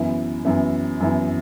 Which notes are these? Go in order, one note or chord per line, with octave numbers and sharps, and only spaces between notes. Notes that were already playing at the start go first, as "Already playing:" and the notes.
Already playing: F#2 E3 B3 E4
F#2 E3 B3 E4
F#2 E3 B3 E4